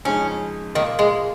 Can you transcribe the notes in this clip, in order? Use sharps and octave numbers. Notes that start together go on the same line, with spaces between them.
F2 C#3 G#3 C#4 D#4
A#2 D#3 A#3 F4
G#3